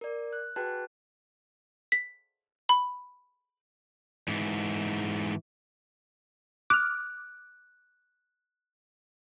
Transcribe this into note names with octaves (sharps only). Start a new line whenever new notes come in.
A#4 D5
F#6
F#4 G#4 B4 G5 A5 F#6
B6
B5
G#2 E3
D6 F6 F#6